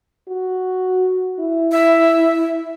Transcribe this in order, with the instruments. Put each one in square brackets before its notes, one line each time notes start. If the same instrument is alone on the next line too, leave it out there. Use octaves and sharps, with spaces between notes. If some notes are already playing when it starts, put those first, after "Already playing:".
[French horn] F#4
E4
[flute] E5